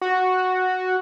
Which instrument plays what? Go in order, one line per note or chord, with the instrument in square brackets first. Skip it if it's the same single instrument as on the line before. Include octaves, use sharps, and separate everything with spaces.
[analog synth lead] F#4